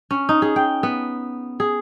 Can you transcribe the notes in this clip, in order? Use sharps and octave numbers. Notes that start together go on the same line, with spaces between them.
C#4
D#4
G#4
G5
B3
G#4